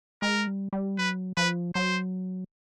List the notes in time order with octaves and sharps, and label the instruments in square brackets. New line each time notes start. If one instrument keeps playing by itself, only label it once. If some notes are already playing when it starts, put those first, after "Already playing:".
[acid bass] G#3 [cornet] A#4
[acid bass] G3
G3
[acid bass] F#3 [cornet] B4
[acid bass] F3 [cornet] B4
[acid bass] F#3 [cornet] C5